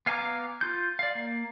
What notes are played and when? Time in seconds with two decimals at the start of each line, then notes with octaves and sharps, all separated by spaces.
0.06 B3 F5 G#5 A#5 D6
0.61 F4 G6
0.99 D5 F5
1.15 A#3